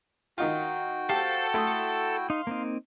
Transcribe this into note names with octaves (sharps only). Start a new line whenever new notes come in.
D#3 D#4 F4 F#4 G5
G4 A4 C5 F5 A5
A3 E4 C6 D#6
D#4 F5 C6
A#3 C4 D#4